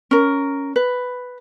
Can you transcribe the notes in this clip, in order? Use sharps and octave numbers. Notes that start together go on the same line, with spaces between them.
C#4 A#4
B4